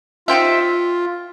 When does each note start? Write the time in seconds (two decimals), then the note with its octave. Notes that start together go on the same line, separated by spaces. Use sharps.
0.28 D#4 F4 G4 C5 E5